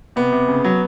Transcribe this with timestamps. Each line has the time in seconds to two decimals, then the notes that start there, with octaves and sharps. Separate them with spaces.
0.16 C3 B3
0.33 C3
0.48 C#3
0.64 F#3